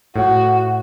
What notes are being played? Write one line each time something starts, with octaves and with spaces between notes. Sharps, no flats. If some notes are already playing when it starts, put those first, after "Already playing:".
A2 F#4